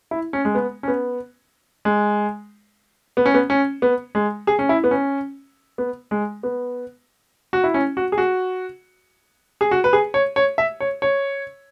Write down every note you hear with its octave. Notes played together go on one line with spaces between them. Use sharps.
E4
C#4
G#3
B3
C#4
B3
G#3
B3
C#4
B3
C#4
B3
G#3
G#4
C#4
E4
B3
C#4
B3
G#3
B3
F#4
E4
C#4
F#4
G#4
F#4
G#4
F#4
B4
G#4
C#5
C#5
E5
C#5
C#5